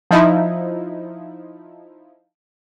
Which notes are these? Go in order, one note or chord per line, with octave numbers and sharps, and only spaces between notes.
F3 D#4 E4